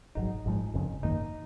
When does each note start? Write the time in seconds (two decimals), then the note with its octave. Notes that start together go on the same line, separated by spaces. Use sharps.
0.15 G#1 G#2 F#3 D#4
0.46 G#1 G#2 F3 G#3
0.74 F#1 F2 C#3
1.03 G#1 F#2 D#3 A#3 D#4